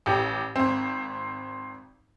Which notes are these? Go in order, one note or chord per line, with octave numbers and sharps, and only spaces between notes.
A1 G4
G#1 C4